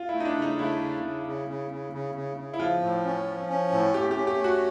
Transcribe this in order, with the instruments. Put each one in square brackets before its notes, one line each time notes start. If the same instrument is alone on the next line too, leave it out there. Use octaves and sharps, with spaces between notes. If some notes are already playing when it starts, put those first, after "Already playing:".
Already playing: [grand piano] F4
E4
[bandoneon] A3
[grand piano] D#4
D4
[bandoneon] C#3 [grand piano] D#4
[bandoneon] A3 [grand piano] E4
[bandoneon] C#3
C#3
C#3
C#3
C#3
C#3
C#3
C#3
[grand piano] E4
[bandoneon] F3 [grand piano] F4
[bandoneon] A2
C#4
F3
C#4
A2
[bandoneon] A3 [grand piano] G4
[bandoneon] C#4 [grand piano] G4
[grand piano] G4
[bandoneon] A3
[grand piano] F#4